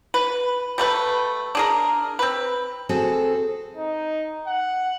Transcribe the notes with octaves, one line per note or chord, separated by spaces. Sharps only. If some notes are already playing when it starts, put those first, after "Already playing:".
B4
G3 A3 B4
D4 G#4 A#4
C4 B4
C4 F#4 G#4 A4
D#4
F#5